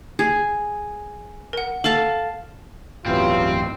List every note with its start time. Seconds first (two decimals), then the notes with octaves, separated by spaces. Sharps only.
0.19 G#4
1.53 A#4 F#5
1.84 A4 F5 A5
3.06 D1 G2 C3 E3 F#3 B3 C4 F4